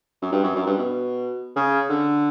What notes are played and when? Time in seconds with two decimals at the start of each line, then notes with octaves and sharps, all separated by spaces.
0.22 F#2
0.32 G2
0.43 F#2
0.56 F#2
0.66 G2
0.78 B2
1.56 C#3
1.89 D3